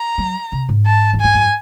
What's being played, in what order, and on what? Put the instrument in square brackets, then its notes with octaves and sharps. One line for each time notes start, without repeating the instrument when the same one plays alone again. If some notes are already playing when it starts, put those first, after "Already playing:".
Already playing: [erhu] A#5
[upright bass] F#3
C3
G#2
[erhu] A5
[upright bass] E2
[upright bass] F2 [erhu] G#5
[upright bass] F#2